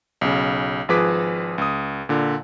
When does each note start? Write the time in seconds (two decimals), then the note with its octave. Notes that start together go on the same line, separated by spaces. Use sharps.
0.21 B1 C#3
0.89 G#1 F3 G#4 B4 D6 B6
1.58 C#2 D#6
2.09 A#2 D3